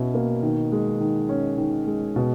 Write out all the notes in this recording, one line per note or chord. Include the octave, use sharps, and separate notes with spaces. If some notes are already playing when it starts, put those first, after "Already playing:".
Already playing: B2 C#4 E4
A#3
D#3
G#3
D#3
C#4
D#3
G#3
B2